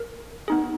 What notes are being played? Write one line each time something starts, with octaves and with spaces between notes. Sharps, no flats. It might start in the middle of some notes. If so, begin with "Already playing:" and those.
Already playing: A#4
B3 D#4 G#4